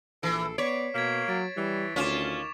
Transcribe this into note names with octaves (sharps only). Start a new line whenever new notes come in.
A#1 E3 A4 C7 D7
B3 C#5 D5 C#6 B6 D7
B2 A#3 G#6 B6 E7
F#3 G#6 A6 D7
E3 G3
D2 D#3 C#4 F4 C#6 D6 E7